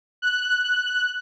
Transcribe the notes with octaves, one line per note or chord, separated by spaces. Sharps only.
F#6